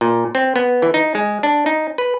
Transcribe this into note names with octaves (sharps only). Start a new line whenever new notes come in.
A#2
C4
B3
E3
D#4
G#3
D4
D#4
B4